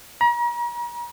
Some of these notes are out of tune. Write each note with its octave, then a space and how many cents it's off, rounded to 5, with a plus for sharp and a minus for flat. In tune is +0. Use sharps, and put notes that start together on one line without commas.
A#5 +40